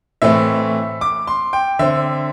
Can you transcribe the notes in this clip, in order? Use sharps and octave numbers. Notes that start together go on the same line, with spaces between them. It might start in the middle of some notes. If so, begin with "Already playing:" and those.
A2 E3 A3 C4 E5
D6
C6
G5
D3 C4 E5